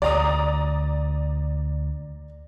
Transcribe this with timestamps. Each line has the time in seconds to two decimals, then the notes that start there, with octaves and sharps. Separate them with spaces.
0.02 D2 D5 A#5 D#6